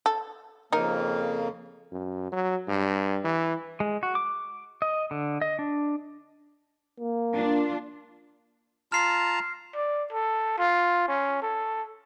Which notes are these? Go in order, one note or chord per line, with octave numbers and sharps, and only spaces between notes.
A4
F2 C#3 A#3 D#4 A#4
F#2
F#3
G2
E3
G#3
F#4
D6
D#5
D3
D#5
D4
A#3
D4 F4
F4 A5 A#5 F6 C7
D5
A4
F4
C#4
A4